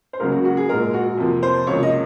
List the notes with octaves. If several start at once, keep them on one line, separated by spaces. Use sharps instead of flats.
C5
C#2 C#3 F#3 A#3 A#4
F#4
F#4
G#4
A#1 A#2 G#3 A#4
F#4
F2 C3 F3 A#3
C5
C#2 C3 F3 A#3 C#5
D#5